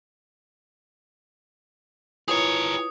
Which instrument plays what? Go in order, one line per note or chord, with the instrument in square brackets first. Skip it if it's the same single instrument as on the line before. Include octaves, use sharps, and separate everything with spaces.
[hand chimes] E4 F4 B4 [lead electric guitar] G#4 A#4 [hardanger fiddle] C#5 [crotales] D#6